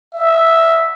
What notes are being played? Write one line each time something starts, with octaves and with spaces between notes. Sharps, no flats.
E5